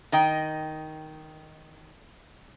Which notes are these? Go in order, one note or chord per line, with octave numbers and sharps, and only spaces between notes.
D#3 D#5 G5